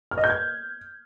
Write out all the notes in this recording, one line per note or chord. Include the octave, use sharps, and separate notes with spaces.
F6
D#5
G6
G#6